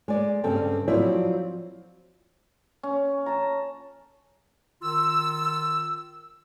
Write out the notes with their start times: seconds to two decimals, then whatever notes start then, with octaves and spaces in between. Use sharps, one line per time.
0.08 G#3 D5
0.44 G2 C#3 G3 C4 A4 G5
0.88 F3 F#3 C4 E4 D5 E5
2.83 C#4
3.26 C#4 A5 A#5
4.82 D#3 F4 E6